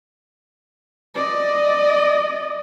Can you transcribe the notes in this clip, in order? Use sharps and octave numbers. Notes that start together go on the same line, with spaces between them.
D5 D#5